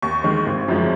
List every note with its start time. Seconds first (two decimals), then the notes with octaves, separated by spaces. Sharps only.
0.02 D#2 C#6
0.24 D#3 G#3
0.46 G#1
0.68 F#2 F3 G#3